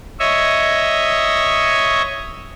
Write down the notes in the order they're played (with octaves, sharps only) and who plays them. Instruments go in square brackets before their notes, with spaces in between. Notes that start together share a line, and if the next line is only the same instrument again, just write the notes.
[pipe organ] C#5 D#5 E5